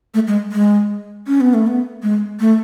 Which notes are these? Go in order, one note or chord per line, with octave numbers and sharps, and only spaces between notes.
A3
G#3
G#3
C#4
B3
A3
B3
G#3
A3